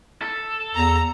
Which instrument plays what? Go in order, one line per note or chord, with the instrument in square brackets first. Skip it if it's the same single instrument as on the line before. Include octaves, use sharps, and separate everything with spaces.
[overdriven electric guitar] A4
[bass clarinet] E2 [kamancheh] A#5